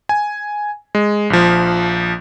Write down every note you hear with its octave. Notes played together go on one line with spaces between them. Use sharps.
G#5
G#3
A#1 F3